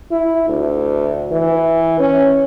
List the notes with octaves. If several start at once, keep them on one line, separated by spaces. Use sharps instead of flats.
E4
D2
E3
C#4